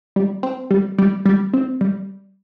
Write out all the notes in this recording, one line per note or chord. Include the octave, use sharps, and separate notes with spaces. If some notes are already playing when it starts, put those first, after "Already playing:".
G3
C4
G3
G3
G3
C4
G3